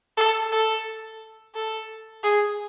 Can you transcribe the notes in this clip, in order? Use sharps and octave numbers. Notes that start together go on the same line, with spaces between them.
A4
A4
A4
G#4